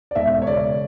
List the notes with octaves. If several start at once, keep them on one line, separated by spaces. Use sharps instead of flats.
D5
E1 E5
C#5
C#3 D5